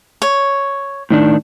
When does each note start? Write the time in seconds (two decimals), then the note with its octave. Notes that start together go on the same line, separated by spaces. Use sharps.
0.22 C#5
1.11 A2 D#3 D4